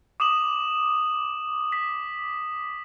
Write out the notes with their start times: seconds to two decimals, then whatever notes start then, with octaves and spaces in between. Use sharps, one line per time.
0.20 D6 D#6 E7 F#7
1.72 B6